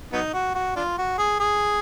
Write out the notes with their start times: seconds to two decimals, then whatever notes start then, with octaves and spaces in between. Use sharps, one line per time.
0.12 F#3 B3 D#4
0.34 F#4
0.55 F#4
0.76 D4 F4
0.98 F#4
1.18 G#4
1.40 G#4